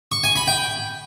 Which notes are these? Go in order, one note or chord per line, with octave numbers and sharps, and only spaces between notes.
C#6
G#5
B5
G5